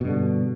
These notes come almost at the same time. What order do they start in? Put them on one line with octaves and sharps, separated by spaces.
B2 G2 D3